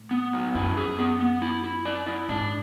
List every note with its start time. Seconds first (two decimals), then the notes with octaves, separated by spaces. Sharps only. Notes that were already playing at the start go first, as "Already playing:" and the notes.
Already playing: A2
0.11 B3
0.33 F#3
0.55 F#2 E4
0.77 G#4
0.98 B3
1.20 B3
1.42 E4
1.64 E4
1.85 D5
2.07 E4
2.29 G#2 D4